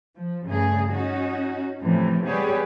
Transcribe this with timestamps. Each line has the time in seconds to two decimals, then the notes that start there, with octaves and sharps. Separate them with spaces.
0.16 F3
0.45 G2 C#3 A3 G#4
0.91 C#4 D#4 F#4
1.81 A2 C3 E3 F3
2.25 G3 B3 G4 G#4 B4 C#5